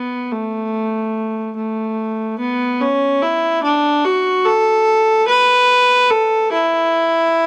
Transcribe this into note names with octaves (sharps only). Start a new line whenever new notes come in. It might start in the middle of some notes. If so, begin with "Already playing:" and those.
Already playing: B3
A3
A3
B3
C#4
E4
D4
F#4
A4
B4
A4
E4